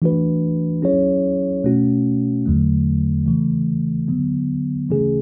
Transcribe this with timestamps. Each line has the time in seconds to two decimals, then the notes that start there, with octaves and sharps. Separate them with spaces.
0.02 E3 A3 D4 F#4 B4
0.82 F#3 C#4 E4 G#4 C#5
1.64 B2 A3 C#4 F#4
2.46 E2 D3 F#3 A3
3.26 C#3 E3 A3
4.08 D3 F#3 B3
4.89 C#3 E3 A3 C#4 G#4